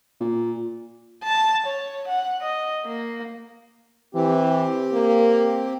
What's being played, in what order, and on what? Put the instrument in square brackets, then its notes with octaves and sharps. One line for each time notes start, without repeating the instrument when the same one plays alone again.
[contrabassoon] A#2
[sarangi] A5
C#5
F#5
D#5
A#3
[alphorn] E3 [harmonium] C4 G4
[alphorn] A#3